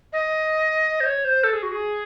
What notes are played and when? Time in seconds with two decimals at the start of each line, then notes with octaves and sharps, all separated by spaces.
0.13 D#5
1.00 C5
1.06 C#5
1.25 C5
1.44 A4
1.53 G#4
1.63 F#4
1.72 G#4